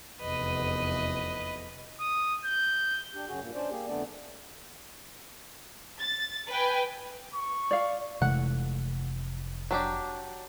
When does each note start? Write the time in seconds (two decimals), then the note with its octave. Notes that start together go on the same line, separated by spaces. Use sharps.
0.21 F1 E2 B4 D#5
2.01 D#6
2.45 G6
3.13 D4 G4
3.28 F#2 C#3 F#4 G#4
3.42 G2 A#2 A#3
3.55 C#4 D4 C5 D5
3.70 A#3 G4 G#4
3.87 F2 D3 A3 B3 D4 D5
6.00 A6
6.50 B4 G5 G#5
7.34 C#6
7.71 D5 F5
8.22 F1 C3 E3 G#3 A3 F#5
9.71 F#3 D4 G4